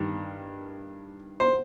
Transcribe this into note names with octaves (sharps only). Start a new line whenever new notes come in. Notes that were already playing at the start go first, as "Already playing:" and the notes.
Already playing: G2 D#3
C5